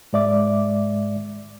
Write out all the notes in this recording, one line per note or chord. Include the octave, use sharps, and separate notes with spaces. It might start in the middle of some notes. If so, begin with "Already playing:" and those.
G#2 G#3 D5 E5 D6